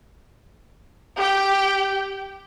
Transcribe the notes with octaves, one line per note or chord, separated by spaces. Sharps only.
G4 G5